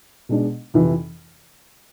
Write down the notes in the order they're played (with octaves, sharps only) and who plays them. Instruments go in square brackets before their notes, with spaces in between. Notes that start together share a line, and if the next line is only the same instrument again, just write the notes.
[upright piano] B2 G#3 D4
F2 C3 E3